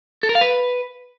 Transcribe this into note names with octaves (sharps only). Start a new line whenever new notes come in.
A4
A#4
F5
B4